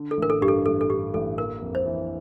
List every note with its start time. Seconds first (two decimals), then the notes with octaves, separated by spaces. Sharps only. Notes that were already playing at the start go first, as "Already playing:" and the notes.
Already playing: D3
0.11 A4
0.17 A1
0.22 A#4
0.30 A4
0.41 G2 G4
0.48 A4
0.66 A1 A4
0.81 A4
0.90 D3 G4
1.14 A1 A4
1.38 A#3 A#4
1.62 F2
1.75 C5
1.86 E3